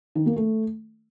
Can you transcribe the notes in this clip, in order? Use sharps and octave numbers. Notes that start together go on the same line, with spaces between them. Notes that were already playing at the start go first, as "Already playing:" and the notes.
D#3
A#3
A3